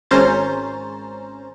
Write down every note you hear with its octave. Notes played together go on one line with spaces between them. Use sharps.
G#1 C#4 C5 A#5 A6